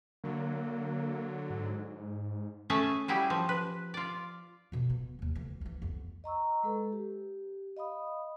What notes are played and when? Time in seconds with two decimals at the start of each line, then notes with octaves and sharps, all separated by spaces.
0.24 D3 F#3 A#3
1.50 G#2
2.70 A3 C#4 G#4 E5 A5
3.08 F#3 G3 E4 G4 G#4
3.30 F3
3.49 B4
3.94 F4 D5
4.72 F2 B2
4.90 B3
5.19 D#2 C3
5.35 D2 E3
5.61 C2 E3
5.82 F2 B3
6.24 D#5 A#5 C#6 E6
6.63 G#3 A4 B4
6.92 G4
7.77 D#5 F5 B5 D#6